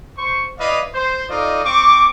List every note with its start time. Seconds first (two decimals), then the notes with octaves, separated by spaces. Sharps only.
0.17 C5 C#6
0.58 E4 B4 D5 D#5 F5
0.93 C5
1.29 D#4 F4 A4 D5 D#5
1.64 C4 C#6 D6